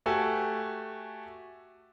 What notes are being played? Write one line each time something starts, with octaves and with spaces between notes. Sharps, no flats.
A3 F#4 G4 A4 G#5